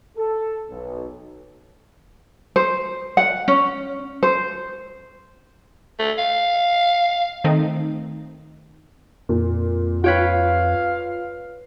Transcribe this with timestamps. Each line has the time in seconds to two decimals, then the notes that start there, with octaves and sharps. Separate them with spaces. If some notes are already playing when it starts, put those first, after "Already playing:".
0.17 A4
0.69 B1
2.56 C5
3.17 F#5
3.48 C#4
4.23 C5
5.99 A3
6.18 F5
7.44 D#3 A3 C4 D#4
9.29 F2 A#2
10.04 F4 B4 C#5 F5 G5